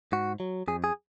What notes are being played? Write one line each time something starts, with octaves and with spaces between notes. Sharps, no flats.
G#2 F#4
F#3
F2 G#4
G#4